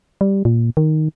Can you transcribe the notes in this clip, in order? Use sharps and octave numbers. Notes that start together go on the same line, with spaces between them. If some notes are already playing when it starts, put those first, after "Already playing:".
G3
A#2
D#3